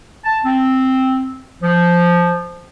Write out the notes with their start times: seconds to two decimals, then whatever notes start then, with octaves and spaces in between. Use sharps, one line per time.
0.24 A5
0.45 C4
1.63 F3